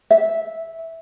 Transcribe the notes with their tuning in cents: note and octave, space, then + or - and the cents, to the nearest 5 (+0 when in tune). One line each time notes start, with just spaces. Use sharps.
E5 -5